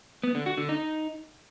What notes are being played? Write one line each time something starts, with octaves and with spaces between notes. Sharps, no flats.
B3
D3
F#4
D3
D#4